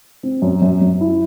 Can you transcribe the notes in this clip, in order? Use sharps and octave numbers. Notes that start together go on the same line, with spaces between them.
C4
F#2
F#2
F#2
E4